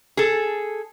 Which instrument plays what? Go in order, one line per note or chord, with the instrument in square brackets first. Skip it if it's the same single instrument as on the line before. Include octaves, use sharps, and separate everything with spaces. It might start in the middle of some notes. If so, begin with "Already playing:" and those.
[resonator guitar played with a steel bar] G#4 A4